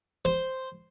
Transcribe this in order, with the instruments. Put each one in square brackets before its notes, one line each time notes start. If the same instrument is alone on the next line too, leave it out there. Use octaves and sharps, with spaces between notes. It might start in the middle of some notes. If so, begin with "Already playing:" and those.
[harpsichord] C5